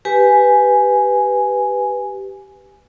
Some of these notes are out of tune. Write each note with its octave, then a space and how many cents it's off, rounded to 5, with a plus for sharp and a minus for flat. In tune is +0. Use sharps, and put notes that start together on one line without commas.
G4 -5 B4 +0 G#5 +5